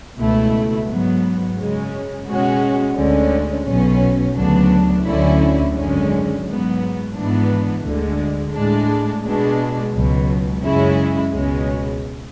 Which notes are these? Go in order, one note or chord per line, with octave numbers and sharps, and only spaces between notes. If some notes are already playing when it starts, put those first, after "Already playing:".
C#2 B2 A3 E4
G#2 F#3 B3
F#2 C#3 G#3 C#4
B2 G#3 C#4 F#4
D2 D3 G#3 C#4
B1 B2 F#3 C#4
D2 C#3 F#3 B3 D4
D2 D3 F#3 C#4 E4
G#1 F#2 D3 G#3 C#4
G#2 F#3 B3
G#1 G#2 E3 B3 D4
D2 D3 G#3
A2 G#3 D4
B2 G#3 D4
C#2 B2 F#3
F#2 C#3 G#3 C#4 E4
C#2 B2 G#3 C#4